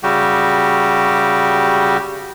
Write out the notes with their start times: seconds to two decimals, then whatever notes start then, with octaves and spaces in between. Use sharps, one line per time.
0.03 C#3 G3 F#4 G4